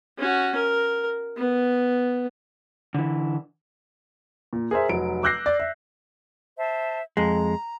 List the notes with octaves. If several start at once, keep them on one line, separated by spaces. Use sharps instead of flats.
C#4 F#4
A#4
B3
D3 E3
A#2
G#4 A#4 C5 E5
F1 F#3 D7
D6 E6 F#6 G6 A#6 C7
D5
E5
C5 E5 A5
F2 G#3 A#5